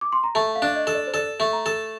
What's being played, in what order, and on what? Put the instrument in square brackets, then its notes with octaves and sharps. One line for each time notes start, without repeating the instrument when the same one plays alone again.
[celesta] D6
C6
A#5
[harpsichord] A3 [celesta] A5
[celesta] F5
[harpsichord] D4
[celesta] D#5
[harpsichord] A4
[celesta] D5
C5
[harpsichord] A4 [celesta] D5
[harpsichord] A3
[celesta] A#5
[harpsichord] A4